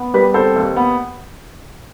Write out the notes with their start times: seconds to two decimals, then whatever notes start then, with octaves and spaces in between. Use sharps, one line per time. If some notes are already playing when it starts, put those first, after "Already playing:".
Already playing: B3
0.14 G3 G4 B4
0.34 C4 A4 C5
0.56 D#2
0.76 B3